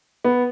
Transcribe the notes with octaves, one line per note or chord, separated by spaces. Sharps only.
B3